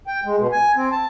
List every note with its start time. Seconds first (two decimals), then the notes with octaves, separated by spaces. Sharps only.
0.07 G5
0.25 G#3
0.39 B2
0.52 G#5
0.76 C4
0.92 A5